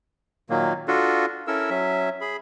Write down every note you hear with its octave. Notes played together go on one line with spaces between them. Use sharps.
A#2 D#3 F#3 A#3
D4 F4 F#4 A4
C#4 E4 A4 A#4 E6
F#3 C#4 E5
G#4 B5